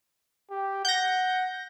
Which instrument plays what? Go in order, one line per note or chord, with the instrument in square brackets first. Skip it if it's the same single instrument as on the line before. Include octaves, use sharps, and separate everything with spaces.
[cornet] G4
[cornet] F#5 [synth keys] G6 A#6